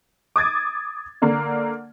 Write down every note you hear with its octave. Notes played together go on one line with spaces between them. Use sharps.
D6 D#6 G#6 A6
D3 A#3